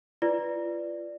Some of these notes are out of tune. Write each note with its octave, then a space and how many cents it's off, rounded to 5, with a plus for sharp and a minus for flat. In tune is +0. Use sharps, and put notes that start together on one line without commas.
F4 -30 B4 +0 D5 +0